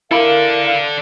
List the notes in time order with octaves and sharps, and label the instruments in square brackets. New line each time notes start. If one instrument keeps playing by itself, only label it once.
[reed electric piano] E4 B5 [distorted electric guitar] A4 D5 [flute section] A#4 F5